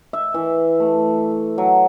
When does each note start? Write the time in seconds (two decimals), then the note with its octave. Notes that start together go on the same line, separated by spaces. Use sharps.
0.13 E5
0.34 E3
0.80 A3
1.58 F#3